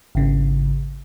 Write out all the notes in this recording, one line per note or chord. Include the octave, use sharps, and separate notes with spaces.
G#1 C#3